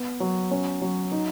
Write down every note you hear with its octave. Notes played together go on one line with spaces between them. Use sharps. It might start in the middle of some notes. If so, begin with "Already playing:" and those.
Already playing: B3
F#3
C#4
F#3
D#4